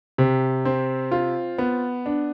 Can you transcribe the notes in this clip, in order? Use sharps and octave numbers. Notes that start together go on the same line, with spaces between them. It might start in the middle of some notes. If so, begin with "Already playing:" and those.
C3
C4
F4
B3
D4